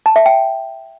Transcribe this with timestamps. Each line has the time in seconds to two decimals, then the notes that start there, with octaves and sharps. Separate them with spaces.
0.06 A5
0.16 E5
0.26 G5